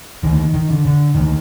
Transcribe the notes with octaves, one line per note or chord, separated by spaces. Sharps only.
D2 D#3
D#3
D3
D3
D2 D#3